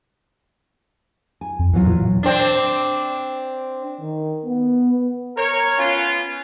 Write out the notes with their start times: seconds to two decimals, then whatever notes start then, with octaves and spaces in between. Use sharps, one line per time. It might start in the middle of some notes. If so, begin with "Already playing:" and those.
1.41 G#5
1.59 F2
1.73 E2 E3 F#3 F4
1.86 A#2
2.23 C4 D4
4.01 D#3
4.46 B3
5.37 A#4 C#5
5.78 B3 C#4 F4